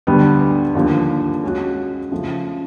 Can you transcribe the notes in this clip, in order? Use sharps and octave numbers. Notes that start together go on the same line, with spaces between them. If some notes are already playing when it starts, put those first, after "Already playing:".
D2 D3 G3 B3 D4
D#2 D3 F3 A#3
G#3 C#4 F#4
C#3 F3 A3